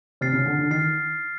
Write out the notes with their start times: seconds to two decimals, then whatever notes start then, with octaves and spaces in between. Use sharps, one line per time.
0.21 C3 F6 A6 C7
0.33 C#3
0.46 D3
0.59 D3
0.70 D#3 F6 A6 C7